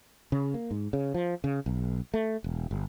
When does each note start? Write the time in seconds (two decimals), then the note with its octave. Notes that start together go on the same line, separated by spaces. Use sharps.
0.32 C#3
0.54 A#3
0.71 G#2
0.93 C#3
1.14 F3
1.44 C#3
1.66 B1
2.14 A3
2.44 E1
2.71 G1